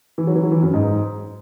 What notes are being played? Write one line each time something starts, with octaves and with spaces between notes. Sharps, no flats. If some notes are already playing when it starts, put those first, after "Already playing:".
E3
F#3
E3
F#3
E3
F#2
G#2